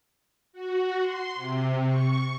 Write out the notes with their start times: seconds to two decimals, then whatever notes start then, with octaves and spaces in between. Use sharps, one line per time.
0.53 F#4
1.01 C6
1.35 C3
1.86 C#6